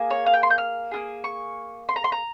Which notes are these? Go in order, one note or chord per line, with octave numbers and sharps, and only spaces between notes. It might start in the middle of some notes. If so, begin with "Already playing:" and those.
Already playing: A#3 G#4
C#5
F5
G5
C6
G6
F6
A#3 F4 G#4
C#6
C6
A#5
C6
A#5